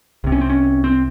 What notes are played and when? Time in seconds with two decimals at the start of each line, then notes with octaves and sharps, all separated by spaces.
0.24 C2 C3
0.32 C#4
0.41 C4
0.50 C#4
0.84 C4